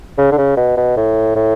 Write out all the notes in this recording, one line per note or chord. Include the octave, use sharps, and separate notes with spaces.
C#3
D3
C#3
B2
B2
A2
A2